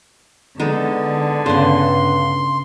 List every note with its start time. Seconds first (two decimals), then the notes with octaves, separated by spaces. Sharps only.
0.60 D3 G#3 B3 D#4 A4
1.46 G2 C#3 B3 C6